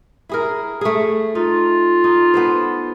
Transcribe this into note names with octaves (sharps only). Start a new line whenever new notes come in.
E4 G#4 A#4
A3 G#4
D#4 F4
D#4
B3 A4 C5